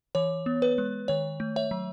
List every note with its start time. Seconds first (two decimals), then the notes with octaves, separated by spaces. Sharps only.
0.15 E3 C#5
0.46 B3
0.62 B4
0.78 G#3
1.08 D#3 C#5
1.40 A3
1.56 C#5 E5
1.71 F#3